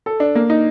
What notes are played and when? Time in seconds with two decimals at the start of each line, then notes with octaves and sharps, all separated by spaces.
0.06 A4
0.20 D4
0.35 A#3
0.50 D#4